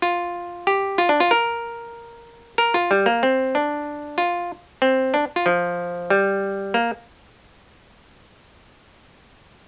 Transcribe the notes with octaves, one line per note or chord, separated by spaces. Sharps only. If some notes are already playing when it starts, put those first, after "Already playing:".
F4
G4
F4
D4
F4
A#4
A#4
F4
G3
A#3
C4
D4
F4
C4
D4
F4
F3
G3
A#3